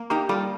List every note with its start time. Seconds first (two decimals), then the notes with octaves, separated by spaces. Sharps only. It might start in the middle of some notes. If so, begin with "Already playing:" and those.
Already playing: A#3
0.10 A#3 D#4 G4
0.29 G3 F4 A4